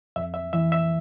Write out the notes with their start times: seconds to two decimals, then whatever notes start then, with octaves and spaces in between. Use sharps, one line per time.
0.16 F2 E5
0.34 E5
0.53 E3 E5
0.72 E5